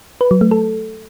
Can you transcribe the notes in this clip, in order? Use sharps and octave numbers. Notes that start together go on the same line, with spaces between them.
B4
F#3
A3
A4